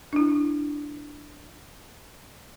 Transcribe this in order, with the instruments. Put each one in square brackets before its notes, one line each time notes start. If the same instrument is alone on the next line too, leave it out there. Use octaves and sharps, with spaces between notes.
[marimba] D4 E4